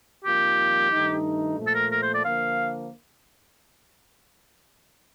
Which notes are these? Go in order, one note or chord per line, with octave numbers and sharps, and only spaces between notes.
F2 D#3 G3 A#3 F4 G4
G2 D#3 A3 D#4
A#2 F3 A3
A4
A#4
A#4
C5
D5
D3 F3 A#3 F5